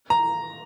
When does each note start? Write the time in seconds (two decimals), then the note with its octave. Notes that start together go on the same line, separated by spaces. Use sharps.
0.10 A#5